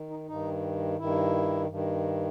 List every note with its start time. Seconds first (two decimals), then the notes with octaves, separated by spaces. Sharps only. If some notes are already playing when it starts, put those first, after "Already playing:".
Already playing: D#3
0.10 D#4
0.28 G2 D#3 D#4
0.99 G2 D#3 E4
1.70 G2 D#3